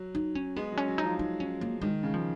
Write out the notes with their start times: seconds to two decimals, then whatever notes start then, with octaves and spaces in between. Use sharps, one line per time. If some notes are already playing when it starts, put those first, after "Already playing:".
Already playing: F#3
0.15 D#4
0.35 C#4
0.56 G#3 B3
0.72 F#3
0.78 C#4
0.88 F#3
0.98 D#4
1.03 F3
1.19 D#4
1.40 C#4
1.61 A#3
1.82 D#3 G#3
2.03 C#3
2.14 F3